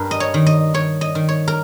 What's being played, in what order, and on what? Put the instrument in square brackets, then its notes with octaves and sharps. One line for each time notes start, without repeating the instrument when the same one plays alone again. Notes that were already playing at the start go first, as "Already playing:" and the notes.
Already playing: [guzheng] G2 A#4
D#5
C#5
D#3
D#5
D#3 C#5
D#5
D#3
C#5
A#4